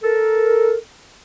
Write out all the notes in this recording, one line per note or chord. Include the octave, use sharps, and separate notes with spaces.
A4 A#4